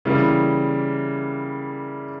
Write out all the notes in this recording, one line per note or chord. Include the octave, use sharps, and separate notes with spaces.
C#3 E3 G3 A#3